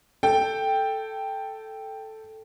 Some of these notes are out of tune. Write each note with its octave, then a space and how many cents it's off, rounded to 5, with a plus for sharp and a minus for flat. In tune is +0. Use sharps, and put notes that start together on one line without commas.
A4 +0 G5 +0